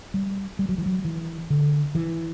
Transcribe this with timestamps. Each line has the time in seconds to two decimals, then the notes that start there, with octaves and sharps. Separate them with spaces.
0.14 G3
0.59 G3
0.69 F#3
0.78 E3
0.86 F#3
1.05 E3
1.50 D3
1.95 E3